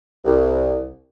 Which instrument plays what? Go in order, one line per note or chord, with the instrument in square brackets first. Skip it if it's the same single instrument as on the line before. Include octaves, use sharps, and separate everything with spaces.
[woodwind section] C2